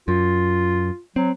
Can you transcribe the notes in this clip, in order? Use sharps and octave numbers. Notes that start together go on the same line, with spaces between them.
F#2 F4
F#3 C4